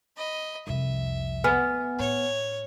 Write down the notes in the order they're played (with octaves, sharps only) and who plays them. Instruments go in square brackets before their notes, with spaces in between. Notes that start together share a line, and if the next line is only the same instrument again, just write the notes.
[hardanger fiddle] D#5 B5
[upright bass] C2 F2 [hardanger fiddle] E5
[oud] B3 [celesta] G#5 F6
[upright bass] A2 [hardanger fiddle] C#5